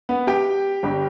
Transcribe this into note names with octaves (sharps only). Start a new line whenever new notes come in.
B3 B4
G4 G5
G1 G2 G3